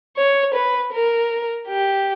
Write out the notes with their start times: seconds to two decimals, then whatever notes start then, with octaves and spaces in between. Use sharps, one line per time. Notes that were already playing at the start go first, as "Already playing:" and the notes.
0.17 C#5
0.55 B4
0.93 A#4
1.68 G4